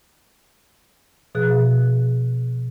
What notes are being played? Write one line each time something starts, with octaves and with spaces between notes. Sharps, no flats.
B2 F3 G#4 F#6